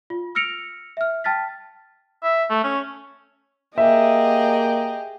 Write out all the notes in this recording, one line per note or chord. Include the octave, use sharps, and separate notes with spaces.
F4
E6 F6 A#6 C#7 D7 F7
E5 F6
G5 A5 F6 A6 B6
E5
A3
C#4
A#3 G4 G#4 D#5 E5